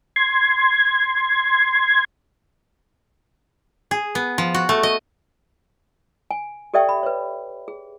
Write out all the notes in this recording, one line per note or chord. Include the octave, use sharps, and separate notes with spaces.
C6 G#6
G#4
B3
F3
F#4
A3
D#5
G#5
G4 A4 D5 E5 G5 C#6
B5
B4 C#5
G#4